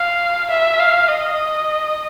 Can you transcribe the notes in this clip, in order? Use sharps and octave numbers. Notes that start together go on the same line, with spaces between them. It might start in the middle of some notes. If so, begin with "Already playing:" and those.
Already playing: F5
E5
F5
D#5